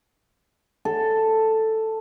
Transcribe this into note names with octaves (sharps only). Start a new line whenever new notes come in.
A4